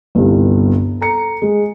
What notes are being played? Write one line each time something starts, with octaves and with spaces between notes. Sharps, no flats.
G1 C2 G2
A4 A#5 C#7
G#3